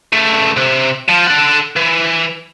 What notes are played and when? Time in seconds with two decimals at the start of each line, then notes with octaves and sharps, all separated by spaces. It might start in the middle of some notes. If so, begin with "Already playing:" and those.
0.13 C#2 A3
0.56 C3
1.08 F3
1.27 A4 F#5
1.76 E3